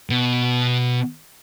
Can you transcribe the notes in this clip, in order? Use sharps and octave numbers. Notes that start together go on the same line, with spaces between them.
B2